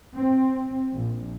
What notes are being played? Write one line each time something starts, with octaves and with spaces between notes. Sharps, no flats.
C4
A#1